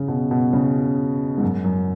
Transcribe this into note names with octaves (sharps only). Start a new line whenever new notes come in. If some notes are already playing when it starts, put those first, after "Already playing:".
Already playing: C#3
B2
B2
C#3
G#2
F#2
F#2